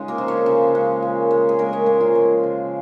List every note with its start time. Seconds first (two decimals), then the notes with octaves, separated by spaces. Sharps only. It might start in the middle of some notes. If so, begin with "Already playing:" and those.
Already playing: C#3 G#3 C#4 D#4 F4 C#5
0.08 A#3 A#4
0.18 F3
0.28 C#4 C#5
0.46 C#3
0.75 G#3
1.02 A#2
1.31 G#3
1.49 G#4
1.59 G#3 A#3 A#4
1.73 C#4 C#5
1.86 A#2 A#3 A#4
2.00 F3 F4
2.15 G#3
2.44 C#3